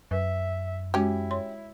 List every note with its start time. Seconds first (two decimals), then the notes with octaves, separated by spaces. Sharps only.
0.11 F#2 B4 E5
0.94 G#3 C#4 E4 F#4 G4
1.31 C#5 C6